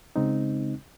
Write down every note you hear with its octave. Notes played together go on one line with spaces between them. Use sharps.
C#3 G#3 C4 D#4